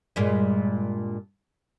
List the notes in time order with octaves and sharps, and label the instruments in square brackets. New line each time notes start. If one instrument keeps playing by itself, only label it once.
[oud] G2 A#2 G#3